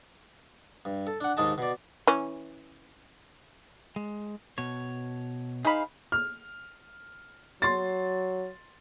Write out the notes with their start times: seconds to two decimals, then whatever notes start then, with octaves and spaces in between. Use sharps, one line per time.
0.85 G2
1.07 A4
1.21 D4 F#5
1.37 D#2 G#2 G#3 D#4 A5
1.58 B2 D5
2.07 E3 C#4
3.96 G#3
4.58 B2 C#5
5.65 D#4 G#4 C5 F5 B5
6.12 F6
7.62 F#3 C6 A6